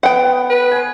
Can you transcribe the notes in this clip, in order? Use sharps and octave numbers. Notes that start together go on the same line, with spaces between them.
B3 F#5 G5
B4
C5 G#5